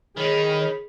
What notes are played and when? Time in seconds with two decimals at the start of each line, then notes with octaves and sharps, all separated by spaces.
0.17 D#3 D#4 G#4 C#5 B5